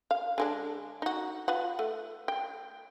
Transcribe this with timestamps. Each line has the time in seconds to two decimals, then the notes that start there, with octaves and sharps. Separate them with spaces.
0.11 F5
0.38 D3 G#3 D4
1.02 D#4 F#4
1.48 F4 B4 F#5
1.79 A3
2.28 G5